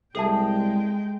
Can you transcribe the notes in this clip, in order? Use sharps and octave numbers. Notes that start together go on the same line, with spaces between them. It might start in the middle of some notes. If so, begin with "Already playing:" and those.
C2 G#3 G#4 A4 E5 G5 A5